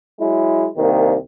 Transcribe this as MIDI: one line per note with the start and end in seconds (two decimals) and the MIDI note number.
0.20 0.67 54
0.20 0.67 56
0.20 0.67 64
0.77 1.15 36
0.77 1.15 51
0.77 1.15 58